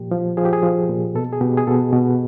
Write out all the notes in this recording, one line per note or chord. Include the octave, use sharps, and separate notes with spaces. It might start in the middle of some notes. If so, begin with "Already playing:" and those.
Already playing: A#2 F3 G4
F3
F3 G#4
G4
G#4
F3
A#2
B2 A4
G#4
B2 G4
G#4
B2 A4
B2